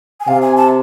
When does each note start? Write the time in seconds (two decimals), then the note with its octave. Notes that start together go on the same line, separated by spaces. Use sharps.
0.20 G#5
0.28 C3 F5
0.42 G#5
0.57 A5